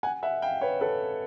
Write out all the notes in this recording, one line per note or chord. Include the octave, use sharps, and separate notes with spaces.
F#5 G#5
E5 F#5
F5 G5
B4 C#5
A4 B4